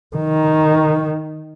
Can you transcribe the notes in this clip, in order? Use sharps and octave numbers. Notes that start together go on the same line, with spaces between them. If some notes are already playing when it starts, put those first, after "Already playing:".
D#3